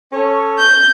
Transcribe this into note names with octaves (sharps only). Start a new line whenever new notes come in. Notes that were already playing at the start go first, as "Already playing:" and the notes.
C#4 A4 C#5
G6